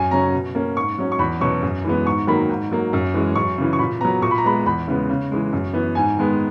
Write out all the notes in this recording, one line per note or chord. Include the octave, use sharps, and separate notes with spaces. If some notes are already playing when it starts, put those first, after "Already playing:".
Already playing: F#2 G#5
C#3 F#3 C#4 A#5
B2
A#3 C#4
G#2 C#6
F#3 C#4
C#6
E2 B5
B2 F#3 C#4 C#6
F#2
E3 G#3 B3
G#2 C#6
D#3 F#3 A#3 B5
G#2
F#3 A#3
F#2
E3 G#3 C#4
F#2 C#6
C#3 E3
C#6
A#2 B5
F#3 B3 A#5
A#2 C#6
B5
A#5
G#3 B3 B5
E2 B5
C#3 E3 G#3 B3
C#3
E3 G#3
F#2
E3 B3
G#2 G#5
D#3 G#3 B3